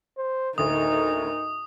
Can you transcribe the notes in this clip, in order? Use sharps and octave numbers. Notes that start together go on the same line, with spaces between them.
C5
D2 A2 D3 D#4 A#4 D#6